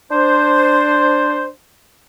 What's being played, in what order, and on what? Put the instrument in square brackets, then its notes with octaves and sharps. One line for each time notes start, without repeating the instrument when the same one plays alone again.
[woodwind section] D4 C5